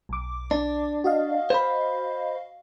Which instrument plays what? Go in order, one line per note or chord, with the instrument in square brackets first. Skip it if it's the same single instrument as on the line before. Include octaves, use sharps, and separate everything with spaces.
[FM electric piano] B1 D6
[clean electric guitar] D4
[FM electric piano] F#4 D#5 F5
[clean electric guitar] C5 B5